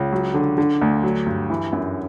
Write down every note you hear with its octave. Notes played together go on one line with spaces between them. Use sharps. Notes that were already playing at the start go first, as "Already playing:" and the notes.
Already playing: C#2
F#3
D3
D3
D2
F#3
G2
E3
F#2